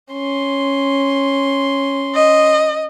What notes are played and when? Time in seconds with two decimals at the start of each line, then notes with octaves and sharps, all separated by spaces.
0.12 C#4 C6
2.15 D#5